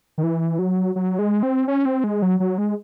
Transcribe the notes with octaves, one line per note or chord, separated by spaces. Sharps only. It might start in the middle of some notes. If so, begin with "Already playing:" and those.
D#3
E3
F#3
F#3
G#3
C4
C#4
C4
G#3
F#3
F#3
G#3